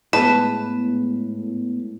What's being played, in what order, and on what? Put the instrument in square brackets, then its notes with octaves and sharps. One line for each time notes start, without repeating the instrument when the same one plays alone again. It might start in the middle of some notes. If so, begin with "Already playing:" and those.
[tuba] A2 [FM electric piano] G#3 B3 [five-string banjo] B4 [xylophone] A5